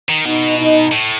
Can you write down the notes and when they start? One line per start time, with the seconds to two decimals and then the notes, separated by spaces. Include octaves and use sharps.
0.09 D#3
0.25 B2 D#4
0.59 D#4
0.92 A2